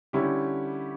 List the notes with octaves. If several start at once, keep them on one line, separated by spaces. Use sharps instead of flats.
D3 G3 C#4 E4 G4